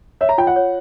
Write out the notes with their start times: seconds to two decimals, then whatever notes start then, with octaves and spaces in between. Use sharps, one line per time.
0.21 C#5 E5
0.29 A#5
0.38 F4 G5
0.47 F#5
0.56 C#5